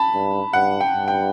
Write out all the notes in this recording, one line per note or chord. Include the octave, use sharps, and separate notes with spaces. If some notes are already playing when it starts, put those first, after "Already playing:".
Already playing: A5 B5
G2
G2 F#5
G5
G2
G5